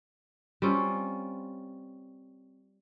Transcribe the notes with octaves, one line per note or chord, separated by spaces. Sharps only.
G3 C4 C#4 F4